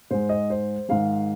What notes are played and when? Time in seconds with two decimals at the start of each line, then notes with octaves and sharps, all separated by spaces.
0.11 G#2 G#3 C5
0.29 D#5
0.50 C5
0.89 G#2 D#3 G#3 F5